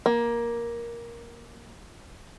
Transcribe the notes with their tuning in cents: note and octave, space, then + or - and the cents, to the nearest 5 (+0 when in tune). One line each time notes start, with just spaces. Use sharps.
A#3 +10